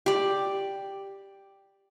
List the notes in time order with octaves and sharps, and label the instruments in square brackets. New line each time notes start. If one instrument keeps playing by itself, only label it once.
[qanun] G4 D5